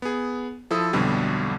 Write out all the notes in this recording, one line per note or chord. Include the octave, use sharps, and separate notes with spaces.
B3 G#4
F3 E4 A4 D#6
B1 F2 B2 D3 G3